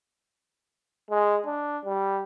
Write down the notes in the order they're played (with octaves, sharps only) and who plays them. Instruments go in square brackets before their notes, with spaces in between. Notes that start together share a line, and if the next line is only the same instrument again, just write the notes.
[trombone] G#3
D4
G3